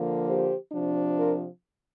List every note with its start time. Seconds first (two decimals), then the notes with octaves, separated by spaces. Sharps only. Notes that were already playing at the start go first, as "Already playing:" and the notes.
Already playing: D3 F3 A#3
0.26 G4 C5
0.72 C3 F3 D4
1.19 F4 A#4